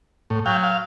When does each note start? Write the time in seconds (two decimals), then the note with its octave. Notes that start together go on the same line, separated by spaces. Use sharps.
0.30 A2
0.46 F#3 F5 G5
0.63 F5